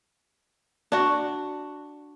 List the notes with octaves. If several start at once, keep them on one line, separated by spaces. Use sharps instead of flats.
D4 F#4